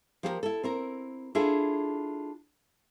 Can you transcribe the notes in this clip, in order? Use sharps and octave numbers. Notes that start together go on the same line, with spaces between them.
F3 G4 G#4 A#4
E4 A4
C4 E4 A#4
D4 E4 F4 G#4 A4 E5